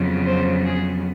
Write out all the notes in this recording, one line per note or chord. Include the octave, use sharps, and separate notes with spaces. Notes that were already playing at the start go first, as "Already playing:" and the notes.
Already playing: F2 C#3 F#3 B3
C5
G#4